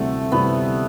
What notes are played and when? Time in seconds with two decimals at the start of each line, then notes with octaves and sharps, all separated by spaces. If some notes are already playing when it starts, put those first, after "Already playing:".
Already playing: D2 C3 E3 G3 A3 C4
0.32 D2 C3 E3 G3 B3 C4